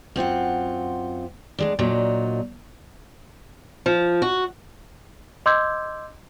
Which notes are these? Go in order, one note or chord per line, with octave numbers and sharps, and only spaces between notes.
F#2 C4 F4 F#5
A2 G#3 D4
A#2 F#3 D4 D#4
F3
F#4
D#5 C6 D6 E6 G6 G#6